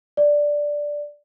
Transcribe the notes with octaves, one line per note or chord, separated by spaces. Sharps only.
D5